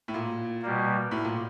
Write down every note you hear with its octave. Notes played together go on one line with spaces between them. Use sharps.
A2
A#2
B2 G3 A#3
A2
A#2